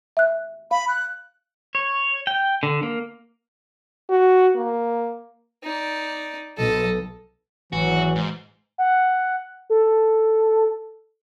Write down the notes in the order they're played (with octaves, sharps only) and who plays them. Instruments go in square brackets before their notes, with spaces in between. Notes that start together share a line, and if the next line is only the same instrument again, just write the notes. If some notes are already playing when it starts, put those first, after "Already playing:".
[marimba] E5 F#6
[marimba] F5 [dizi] B5
[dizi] F#6
[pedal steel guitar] C#5
G5
D3
A#3
[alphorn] F#4
A#3
[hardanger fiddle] D#4 D5
[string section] B1 [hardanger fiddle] A4 D#5
[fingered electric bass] G#1 [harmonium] E2 F#3 [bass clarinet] E3 [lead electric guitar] F#4
[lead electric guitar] G#2
[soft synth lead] F#5
A4